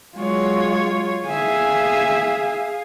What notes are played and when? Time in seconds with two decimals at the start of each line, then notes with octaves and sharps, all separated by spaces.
0.17 F#3 G#3 F4 C#5
1.26 G#4 E5 F5 G#5